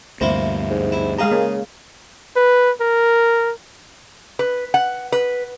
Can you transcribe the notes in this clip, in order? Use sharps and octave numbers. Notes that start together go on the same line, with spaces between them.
D2 G2 C3 A#3 E4 C5
G#2
E4
G#3 G4 G#4 F5 A#5
C#3 A#3
B4
A#4
B4
F#5
B4